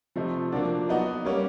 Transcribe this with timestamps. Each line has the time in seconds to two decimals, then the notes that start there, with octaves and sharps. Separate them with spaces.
0.16 C3 F3 A3 C4 D#4
0.52 F3 A#3 D4 F#4
0.88 F#3 B3 D#4 F#4
1.25 G3 A#3 C#4